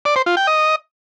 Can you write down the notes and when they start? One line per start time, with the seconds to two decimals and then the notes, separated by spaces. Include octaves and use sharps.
0.05 D5
0.16 C5
0.26 F4
0.37 G5
0.47 D#5